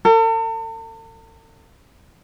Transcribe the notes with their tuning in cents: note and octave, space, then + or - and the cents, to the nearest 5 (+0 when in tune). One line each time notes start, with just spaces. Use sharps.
A4 +45